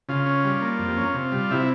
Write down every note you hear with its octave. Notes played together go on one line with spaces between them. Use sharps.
C#3 F4
C#4
G3
A#3
F2
C#4
C3
G3
C3 E4